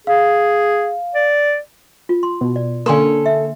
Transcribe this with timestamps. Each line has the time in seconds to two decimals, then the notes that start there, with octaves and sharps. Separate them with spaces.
0.07 G#4 F5
1.15 D5
2.09 F4
2.23 C6
2.41 B2
2.56 D5
2.86 D3 A#3 C#4 A4 G#5 C6 D#6
3.26 E5